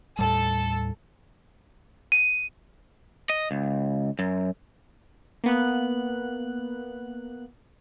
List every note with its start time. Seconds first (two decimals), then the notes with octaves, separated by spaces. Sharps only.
0.19 D#2 A2 G3 A4
2.12 D#7
3.30 D#5
3.51 C#2
4.19 F#2
5.44 A#3 B3 F#6